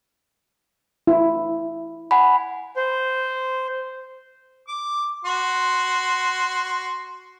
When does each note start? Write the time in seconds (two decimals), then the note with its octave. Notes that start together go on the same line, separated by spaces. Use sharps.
1.07 E4
2.11 F#5 G#5 B5
2.76 C5
4.68 D6
5.25 F#4 C6